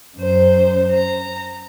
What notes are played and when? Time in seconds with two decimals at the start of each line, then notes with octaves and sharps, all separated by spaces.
0.17 F#2 C5
0.91 A#5